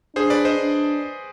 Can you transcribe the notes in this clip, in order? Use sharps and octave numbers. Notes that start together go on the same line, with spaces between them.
D4 G#4 C5
B4 D5
C5 D#5
D4